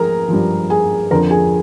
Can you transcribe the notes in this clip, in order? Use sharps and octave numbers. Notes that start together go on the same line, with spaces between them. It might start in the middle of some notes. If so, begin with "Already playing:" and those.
Already playing: F3 G#4 A#4 A#5
G2 F3
G#4 G#5
F2 D3 F3 A#4 A#5
G#4 G#5